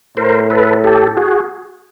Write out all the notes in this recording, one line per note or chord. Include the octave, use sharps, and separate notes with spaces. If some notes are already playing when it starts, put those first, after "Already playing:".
A2 A#4 C5
A4 B4
G4 A4
F#4 G#4